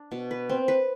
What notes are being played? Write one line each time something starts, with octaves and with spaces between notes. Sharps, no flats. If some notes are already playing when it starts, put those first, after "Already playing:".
Already playing: D4
B2
B4
C4
B4